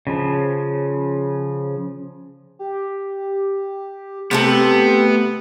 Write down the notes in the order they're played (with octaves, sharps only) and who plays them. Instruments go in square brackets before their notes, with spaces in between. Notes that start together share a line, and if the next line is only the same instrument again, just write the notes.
[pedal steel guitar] C#3 F3
[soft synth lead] G4
[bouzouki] C3 C4 A4 [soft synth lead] A3 [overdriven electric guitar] B3